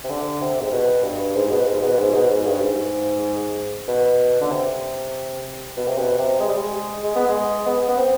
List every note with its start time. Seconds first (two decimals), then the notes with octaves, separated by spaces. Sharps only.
0.04 C3
0.10 D3
0.41 C3
0.62 G#2
0.72 B2
1.04 G2
1.36 G#2
1.52 B2
1.68 G#2
1.83 B2
1.99 G#2
2.14 B2
2.30 G#2
2.46 G2
2.61 G#2
3.88 B2
4.41 D3
4.51 C3
5.77 B2
5.87 C3
5.98 B2
6.18 C3
6.40 G#3
6.48 G3
6.56 G#3
7.03 G#3
7.15 B3
7.28 G#3
7.66 B3
7.89 B3
7.98 C4